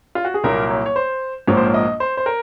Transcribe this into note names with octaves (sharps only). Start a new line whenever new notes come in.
F4
F#4
G#4
C2 A#2 F#3 A#3 A#4
C#5
C#5
C5
A#1 G#2 F3 A#3 C#5
C5
C#5
D#5
C5
C5
A#4